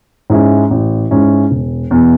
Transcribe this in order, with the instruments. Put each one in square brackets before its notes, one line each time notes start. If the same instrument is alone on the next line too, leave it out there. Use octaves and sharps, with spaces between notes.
[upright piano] G#2 G#3 C#4 E4
A1
G#2 G#3 C#4 E4
E1
E2 B2